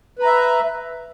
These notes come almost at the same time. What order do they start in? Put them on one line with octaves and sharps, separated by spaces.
B4 A#5 E5